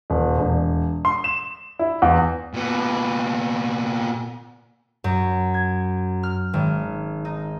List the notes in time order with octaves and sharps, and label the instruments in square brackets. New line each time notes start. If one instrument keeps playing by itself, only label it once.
[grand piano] D#1
E1
C6
E7
E4
E2
[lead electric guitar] A#2 B3
[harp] F#2
G#6
F6
G#1
D#4